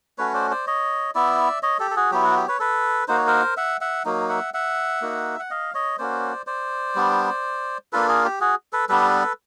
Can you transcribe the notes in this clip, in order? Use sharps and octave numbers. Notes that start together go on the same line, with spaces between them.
A3 C#4 F#4 B4 C#5
C5 D5
C5 D5
C#5 D#5
B3 E4 D5 E5
C#5 D#5
G4 A4
A4
F#4 G#4
F#3 B3 E4 G4
F#4
G4
B4 C#5
A4 B4
A#3 D#4 F#4 C5
C#5
A#4 C5
E5 F#5
E5 F#5
F#3 A#3 D#4
E5 F#5
E5 F#5
A#3 D#4 F#4
F#5
D#5 F5
C#5 D#5
A#3 C#4 F#4 C5 D5
C5 D5
G3 B3 D4
A#3 D4 F4 A4 B4
G#4 A#4
G4
F#4 G#4
A4 B4
G3 B3 D4 A4 B4